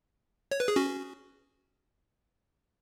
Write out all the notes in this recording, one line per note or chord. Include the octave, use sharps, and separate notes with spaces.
C#5
B4
G#4
C#4 F#4